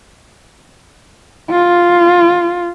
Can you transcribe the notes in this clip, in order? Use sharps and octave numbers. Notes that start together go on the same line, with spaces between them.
F4